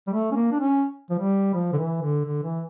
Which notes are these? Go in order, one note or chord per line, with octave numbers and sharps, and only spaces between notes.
G3
A3
C#4
A#3
D4
C#4
F3
G3
F3
D3
E3
D3
D3
E3